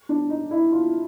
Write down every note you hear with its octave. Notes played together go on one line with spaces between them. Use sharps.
D4
D#4
E4
F4